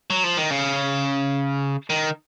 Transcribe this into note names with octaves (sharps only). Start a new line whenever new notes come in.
F#3
F3
D#3
C#3
D#3